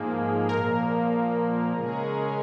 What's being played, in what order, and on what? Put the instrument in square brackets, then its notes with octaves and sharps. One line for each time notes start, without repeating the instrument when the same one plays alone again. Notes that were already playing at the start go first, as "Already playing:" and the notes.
Already playing: [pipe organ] G#2 F3 A#3 [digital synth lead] G#4
[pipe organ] A#2 F3 A#3 [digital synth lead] A#4
[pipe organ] C#3 G#3 C#4 G#4